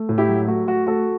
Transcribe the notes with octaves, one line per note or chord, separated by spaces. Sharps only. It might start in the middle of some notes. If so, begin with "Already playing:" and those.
Already playing: A3
A2
E4 G4
F#3
A3 F#4
A3 F#4
A3 F#4 A4